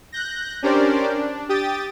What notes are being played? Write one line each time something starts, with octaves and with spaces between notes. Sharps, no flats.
F#6 G6 A#6
C#4 D4 G4 A#4 C5 D5
D4
G4 G5 D#6 A6